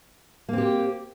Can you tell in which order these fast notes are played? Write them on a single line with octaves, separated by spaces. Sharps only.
A#3 C4 G4